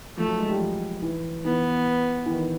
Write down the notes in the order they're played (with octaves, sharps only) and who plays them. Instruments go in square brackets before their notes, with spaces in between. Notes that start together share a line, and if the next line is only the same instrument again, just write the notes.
[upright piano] F3 [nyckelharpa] A3
[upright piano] F#3
G#3
G3
F3
E3
[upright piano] E3 [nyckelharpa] B3
[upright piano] E3
D#3